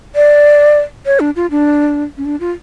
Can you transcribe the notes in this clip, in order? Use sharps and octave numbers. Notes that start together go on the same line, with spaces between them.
D5
C#5
D4
F4
D4
C#4
D4
F4